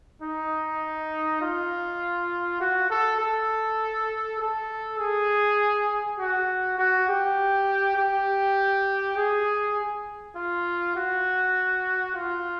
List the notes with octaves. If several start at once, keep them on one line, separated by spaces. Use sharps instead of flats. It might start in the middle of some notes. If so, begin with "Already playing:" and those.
D#4
F4
F#4
A4
A4
A4
G#4
F#4
F#4
G4
G4
G#4
F4
F#4
F4